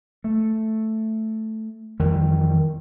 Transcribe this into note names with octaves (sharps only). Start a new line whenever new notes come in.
A3
F2 D#3 E3 G3